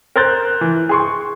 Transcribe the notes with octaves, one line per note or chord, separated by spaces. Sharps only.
A#4 C5 C6 F#6 G6 A6
E3
G#4 C6 C#6